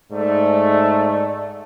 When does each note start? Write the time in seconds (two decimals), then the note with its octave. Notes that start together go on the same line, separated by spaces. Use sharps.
0.12 G#2 A3 D5